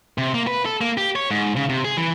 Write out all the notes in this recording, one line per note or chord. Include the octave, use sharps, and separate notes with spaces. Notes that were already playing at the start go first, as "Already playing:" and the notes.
C3
A#3
B4
A4
A#3
G4
C#5
G#2
C#3
C3
G#4
E3